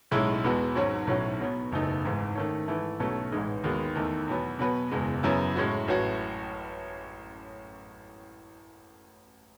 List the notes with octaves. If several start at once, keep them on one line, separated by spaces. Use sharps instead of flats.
B1 A2 G#3 C#4 E4
E2 B2 G#3 B3 F#4
G#1 G#2 F#3 C#4 F#4
B1 A2 F#3 C#4 F#4
B2 F#3 B3
F#1 E2 B2 A3 D#4
G#1 G#2 E3
D#3 A3 C#4
G#2 E3 A3 E4
B1 B2 F#3 A3 C#4
A1 G#2 E3 G#3 D#4
D#2 D#3 G#3 B3 F#4
E2 D#3 A3 D#4
E2 B2 F#3 B3
B2 F#3 B3 F#4 B4
F#1 E2 B2 G#3
F#2 C#3 F#3 B3 E4
A2 G#3 C#4 F#4
A1 A2 F#3 C#4 F#4